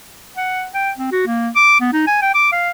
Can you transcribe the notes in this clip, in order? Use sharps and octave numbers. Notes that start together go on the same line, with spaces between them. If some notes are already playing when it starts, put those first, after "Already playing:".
F#5
G5
C4
F#4
A#3
D6
B3
D#4
G#5
G5
D6
F5